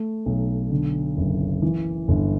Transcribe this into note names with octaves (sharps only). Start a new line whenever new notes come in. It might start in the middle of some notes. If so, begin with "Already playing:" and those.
Already playing: A3
B1
D3
F#1
E3
G1